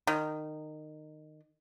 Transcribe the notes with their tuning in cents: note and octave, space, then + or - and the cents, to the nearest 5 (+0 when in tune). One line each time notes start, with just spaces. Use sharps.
D#3 -20